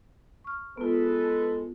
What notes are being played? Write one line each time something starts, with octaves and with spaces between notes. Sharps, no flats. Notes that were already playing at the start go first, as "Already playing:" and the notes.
C#6 F6
G#3 B3 F4 A4 B4